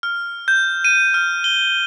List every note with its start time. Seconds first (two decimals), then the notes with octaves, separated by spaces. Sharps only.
0.03 F6
0.48 G6
0.85 D#7
1.14 F6
1.44 G7